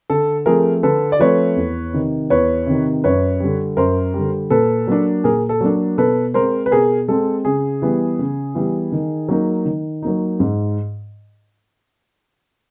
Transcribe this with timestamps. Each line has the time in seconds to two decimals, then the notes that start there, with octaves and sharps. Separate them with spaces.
0.10 D3 A4
0.46 F3 A3 C4 G#4 A#4
0.83 D3 A4 B4
1.12 D5
1.19 F3 A3 C4 B4 C#5
1.57 E2
1.93 C3 D#3
2.30 E2 B4 C#5
2.66 C3 D#3
3.04 F#2 B4 C#5
3.40 D3 G3
3.77 F#2 A#4 C5
4.14 D3 G3
4.50 A#2 A4 B4
4.88 F#3 A#3 D4
5.24 A#2 G#4 A#4
5.49 A4
5.61 F#3 A#3 D4
5.98 B2 A4 B4
6.34 G#3 C4 A#4 C5
6.66 B4
6.71 B2 G#4 A#4
7.08 G#3 C4 A4
7.45 C#3 G#4
7.82 E3 G3 B3
8.19 C#3
8.55 E3 G3 B3
8.92 D#3
9.29 F#3 A#3 D#4
9.65 D#3
10.02 F#3 A#3 D#4
10.40 G#2